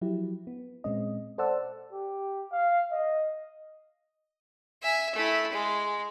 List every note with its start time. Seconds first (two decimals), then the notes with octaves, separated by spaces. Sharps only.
0.01 F3 F#3 E4 G4
0.47 B3
0.84 A#2 G#3 C4 C#4 D#5
1.38 A4 C5 D5 F#5 A5 E6
1.93 G4
2.52 F5
2.92 D#5
4.83 E5 G#5
5.15 A3 E4
5.52 G#3